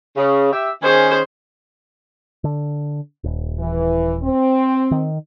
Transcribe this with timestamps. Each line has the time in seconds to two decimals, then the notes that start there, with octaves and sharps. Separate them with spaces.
0.17 C#3
0.53 G4 E5
0.83 D#3 C#4 G#4 C5
2.44 D3
3.24 D#1
3.59 E3
4.22 C4
4.91 D#3